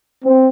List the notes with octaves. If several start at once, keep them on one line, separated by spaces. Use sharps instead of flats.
C4